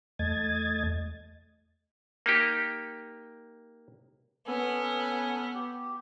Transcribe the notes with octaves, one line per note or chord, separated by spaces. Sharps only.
E2 A3 D#5 G#6 A6
A#3 D#4 G4
B3 C#4 A4 G#5
G4